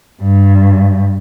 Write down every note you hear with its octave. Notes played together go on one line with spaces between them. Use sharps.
G2